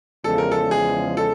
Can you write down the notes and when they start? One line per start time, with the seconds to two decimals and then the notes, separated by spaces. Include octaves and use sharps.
0.24 E2 C#3 F3 G#3 A4
0.38 A#4
0.51 A4
0.71 G#4
1.17 A4